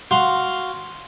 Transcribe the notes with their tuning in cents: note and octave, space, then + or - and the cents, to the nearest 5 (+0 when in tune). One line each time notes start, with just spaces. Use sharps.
F#4 +0 F5 +0 C6 +0